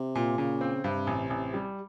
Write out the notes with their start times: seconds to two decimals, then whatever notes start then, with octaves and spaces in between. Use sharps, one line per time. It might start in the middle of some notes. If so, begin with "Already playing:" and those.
Already playing: C3
0.15 A#2
0.38 A#2 C#3
0.61 C4
0.84 G2 C3
1.07 A1
1.30 A1
1.54 G3